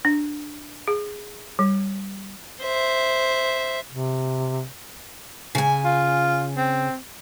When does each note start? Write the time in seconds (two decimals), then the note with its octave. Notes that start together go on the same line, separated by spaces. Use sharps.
0.05 D4
0.88 G#4
1.59 G3
2.62 C5 E5
3.89 C3
5.55 C#3 G#5
5.85 F4
6.57 C4